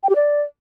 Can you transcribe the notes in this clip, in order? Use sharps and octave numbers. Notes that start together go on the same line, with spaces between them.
G5
G4
D5